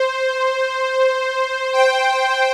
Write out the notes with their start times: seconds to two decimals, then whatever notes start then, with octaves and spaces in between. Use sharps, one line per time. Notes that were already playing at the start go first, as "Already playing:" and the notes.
Already playing: C5
1.73 G5